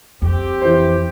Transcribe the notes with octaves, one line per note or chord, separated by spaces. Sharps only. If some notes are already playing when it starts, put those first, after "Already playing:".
F2 C4 G4
E3 C5